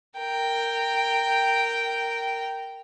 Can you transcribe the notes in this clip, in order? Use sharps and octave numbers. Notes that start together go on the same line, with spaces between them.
A#4 G5